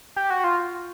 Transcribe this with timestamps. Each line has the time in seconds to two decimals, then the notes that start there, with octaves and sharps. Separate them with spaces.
0.16 G4
0.30 F#4
0.44 F4